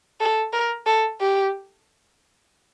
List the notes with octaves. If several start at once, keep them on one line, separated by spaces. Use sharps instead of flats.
A4
A#4
A4
G4